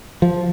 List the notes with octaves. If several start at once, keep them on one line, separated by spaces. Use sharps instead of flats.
F3